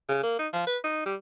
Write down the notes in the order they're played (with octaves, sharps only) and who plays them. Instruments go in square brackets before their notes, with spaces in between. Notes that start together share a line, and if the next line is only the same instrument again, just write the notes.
[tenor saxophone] C#3
A#3
D#4
F3
B4
D#4
G3